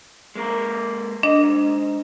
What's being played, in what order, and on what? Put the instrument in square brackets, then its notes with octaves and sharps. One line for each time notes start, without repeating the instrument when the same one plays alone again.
[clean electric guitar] G#3 A#3 A#4
[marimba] D4 [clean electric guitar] D#5
[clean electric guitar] G#2